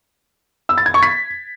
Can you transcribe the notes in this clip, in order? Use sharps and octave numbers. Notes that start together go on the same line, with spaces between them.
E6
A6
G#6
C#6
B6